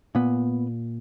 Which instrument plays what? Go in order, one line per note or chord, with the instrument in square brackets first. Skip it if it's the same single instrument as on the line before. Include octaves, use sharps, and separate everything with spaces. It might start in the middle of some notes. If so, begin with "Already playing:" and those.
[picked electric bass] A#2 B3